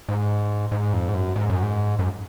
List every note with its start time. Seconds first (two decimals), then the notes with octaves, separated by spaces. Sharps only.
0.09 G#2
0.72 G#2
0.93 F2
1.09 G#2
1.14 F#2
1.36 G#2
1.50 F#2
1.63 G#2
1.99 F#2